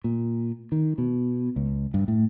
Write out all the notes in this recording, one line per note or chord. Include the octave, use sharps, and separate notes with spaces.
A#2
D#3
B2
C#2
G2
A2